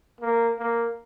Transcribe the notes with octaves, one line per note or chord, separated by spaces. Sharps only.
A#3
A#3